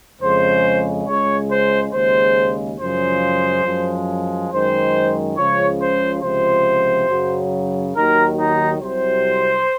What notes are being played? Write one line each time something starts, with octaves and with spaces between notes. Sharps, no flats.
F2 C#3 G#3 C5
C#2 C#3 G#3 C#5
C5
D#2 C#3 G#3 C5
F#2 C#3 F3 G#3 C5
F#2 F3 G#3
F#2 D#3 G#3 C5
C#2 C#3 F3 C#5
C5
C#2 C3 F3 C5
F#2 C#3 F#3
D#2 D#3 F#3 A#4
D#4
C2 C3 F#3 C5